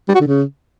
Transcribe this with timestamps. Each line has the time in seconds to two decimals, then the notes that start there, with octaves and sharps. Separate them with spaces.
0.08 G3
0.15 F#4
0.21 D3
0.27 C#3